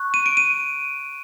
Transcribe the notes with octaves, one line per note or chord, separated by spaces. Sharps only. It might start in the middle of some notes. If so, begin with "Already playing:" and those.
Already playing: C#6 F#6
D#7
D7
D#7